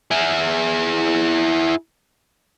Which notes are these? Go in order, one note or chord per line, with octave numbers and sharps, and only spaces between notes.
E4 G#4